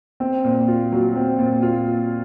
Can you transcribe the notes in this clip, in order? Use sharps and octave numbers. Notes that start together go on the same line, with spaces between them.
C4
A#2
F4
F#3
C4
A#2
F4